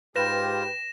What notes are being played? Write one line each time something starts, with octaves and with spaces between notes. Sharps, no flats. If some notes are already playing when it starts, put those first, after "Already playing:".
G#2 F4 G4 B4 C5 G5 A#6 E7